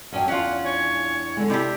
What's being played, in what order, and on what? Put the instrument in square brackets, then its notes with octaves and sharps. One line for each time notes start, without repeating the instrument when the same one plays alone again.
[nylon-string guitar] F#2 D4 G5 [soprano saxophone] C#4
[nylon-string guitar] E2 D4 [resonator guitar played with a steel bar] C#4 F4 [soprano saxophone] F#5
[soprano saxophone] C#5
[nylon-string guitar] D3 G#3
[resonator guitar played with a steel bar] C3 D4 G4 [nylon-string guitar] E4